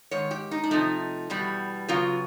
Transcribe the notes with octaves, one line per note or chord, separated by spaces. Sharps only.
G#2 D#3 C#5
G4
D#4
D4
C3 F3 A3 D#4
E2 B2 G3 B3
C#3 F#3 B3 F4